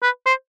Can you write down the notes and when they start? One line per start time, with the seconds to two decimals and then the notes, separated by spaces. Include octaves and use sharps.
0.02 B4
0.26 C5